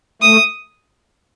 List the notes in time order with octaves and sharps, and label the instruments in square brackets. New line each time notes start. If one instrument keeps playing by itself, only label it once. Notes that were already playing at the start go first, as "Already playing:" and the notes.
[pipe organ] A3 [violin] D#6